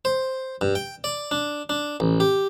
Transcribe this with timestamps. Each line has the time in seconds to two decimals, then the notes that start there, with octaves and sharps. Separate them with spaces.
0.05 C5
0.61 G2
0.75 G5
1.04 D5
1.31 D4
1.69 D4
2.00 A1
2.20 G4